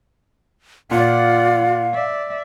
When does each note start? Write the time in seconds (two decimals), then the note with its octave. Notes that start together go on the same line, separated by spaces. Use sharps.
0.91 A#2 F4 D5 F5 F#5
1.92 D5 E5